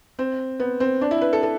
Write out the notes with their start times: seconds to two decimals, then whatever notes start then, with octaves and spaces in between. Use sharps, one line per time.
0.19 C4
0.60 B3
0.80 C4
1.01 D4
1.11 E4
1.21 B4
1.33 A4
1.43 A4